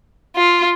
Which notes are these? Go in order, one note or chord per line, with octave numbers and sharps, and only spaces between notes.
F4